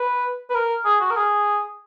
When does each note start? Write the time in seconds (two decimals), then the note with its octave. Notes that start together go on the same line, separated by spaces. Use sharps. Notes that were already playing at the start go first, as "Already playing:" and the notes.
Already playing: B4
0.50 B4
0.54 A#4
0.85 G#4
1.01 F#4
1.10 A#4
1.16 G#4